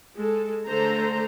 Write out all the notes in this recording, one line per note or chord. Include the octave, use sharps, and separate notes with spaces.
G#3 A4
D3 A3 A4 C5 A#5